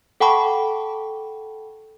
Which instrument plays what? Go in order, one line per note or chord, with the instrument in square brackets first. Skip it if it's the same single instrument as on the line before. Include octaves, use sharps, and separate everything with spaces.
[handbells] A4 F#5 G5 A5 B5 C#6